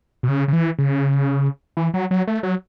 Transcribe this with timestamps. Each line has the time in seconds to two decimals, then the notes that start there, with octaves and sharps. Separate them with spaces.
0.23 B2
0.28 C#3
0.48 C#3
0.53 E3
0.79 C#3
1.77 E3
1.94 F#3
2.11 F#3
2.27 A3
2.43 F#3